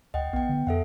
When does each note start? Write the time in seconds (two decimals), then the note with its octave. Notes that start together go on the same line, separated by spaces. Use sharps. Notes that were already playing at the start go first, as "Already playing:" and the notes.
0.14 D2 D#5 F#5 G5
0.33 B1 B3 G5
0.49 D3
0.67 F2 A4 E5 F#5